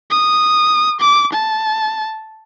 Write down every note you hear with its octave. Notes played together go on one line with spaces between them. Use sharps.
D#6
D6
A5